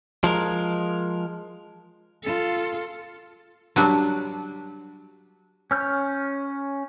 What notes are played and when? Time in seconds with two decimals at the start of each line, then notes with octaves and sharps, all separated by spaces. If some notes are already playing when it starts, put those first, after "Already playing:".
0.24 F3 G#3 A#4
2.24 F4 A4
3.76 F#3 G3 D4
5.71 C#4 F6 G6